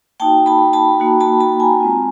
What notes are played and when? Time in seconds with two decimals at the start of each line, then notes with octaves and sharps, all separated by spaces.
0.20 A#3 D#4 F#4 G5 A5
0.46 A5 B5
0.73 A5 B5
1.00 A#3 D#4 F#4
1.21 A5 B5
1.40 A5 B5
1.60 G#5 A#5
1.80 G#3 C4 F4